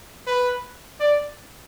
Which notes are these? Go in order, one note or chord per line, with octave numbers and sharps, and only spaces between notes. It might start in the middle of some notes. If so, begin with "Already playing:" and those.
B4
D5